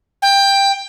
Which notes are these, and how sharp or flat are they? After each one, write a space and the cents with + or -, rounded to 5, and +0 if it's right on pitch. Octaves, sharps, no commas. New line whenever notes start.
G5 +15